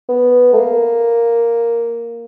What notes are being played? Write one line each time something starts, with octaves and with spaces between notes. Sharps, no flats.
B3
A3
A#3